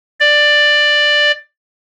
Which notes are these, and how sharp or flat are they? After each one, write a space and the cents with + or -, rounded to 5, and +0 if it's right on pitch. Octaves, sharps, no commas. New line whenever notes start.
D5 +10